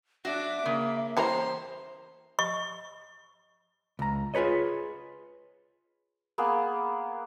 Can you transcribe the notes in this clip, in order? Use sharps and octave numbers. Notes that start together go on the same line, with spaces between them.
F#3 D4 F#4 E5 D6
C#3 A#3
E2 G3 C#4 E4 A#4 C5 A#5 C6
D#5 C#6
C#2 A#5
F4 G#4 B4 C#5 D#5
A#3 B3 G#4